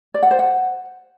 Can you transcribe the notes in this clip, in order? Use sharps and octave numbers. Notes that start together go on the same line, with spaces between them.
D5
F#5
C5
F#5